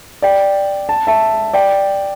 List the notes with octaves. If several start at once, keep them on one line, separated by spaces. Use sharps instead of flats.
D5 G5
A5
E5 A5
D5 G5